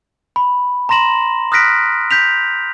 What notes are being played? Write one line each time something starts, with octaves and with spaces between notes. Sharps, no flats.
B5
A#5 C6 A#6 E7 F#7
D#6 F6 F#6 A#6 B6 D7
G6 B6 F7